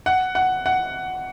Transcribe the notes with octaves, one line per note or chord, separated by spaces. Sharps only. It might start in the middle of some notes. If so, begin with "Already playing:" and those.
F#5
F#5
F#5